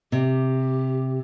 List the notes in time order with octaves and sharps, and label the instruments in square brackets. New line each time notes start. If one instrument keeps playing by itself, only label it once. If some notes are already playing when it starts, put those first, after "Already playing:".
[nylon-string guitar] C3 [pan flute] G4